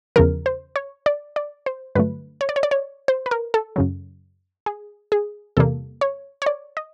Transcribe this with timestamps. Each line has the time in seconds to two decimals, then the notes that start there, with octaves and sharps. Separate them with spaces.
0.16 E2 C#3 F3 A#4
0.46 C5
0.76 C#5
1.06 D5
1.36 D5
1.66 C5
1.95 G2 D3 F#3 A3 B4
2.41 C#5
2.49 D5
2.56 C#5
2.63 D5
2.71 C#5
3.08 C5
3.26 B4
3.31 A#4
3.54 A4
3.76 F#2 C#3 F#3
4.66 G#4
5.12 G#4
5.57 E2 C3 E3 G3 A#3 A4
6.01 C#5
6.42 C#5
6.46 D5
6.77 D#5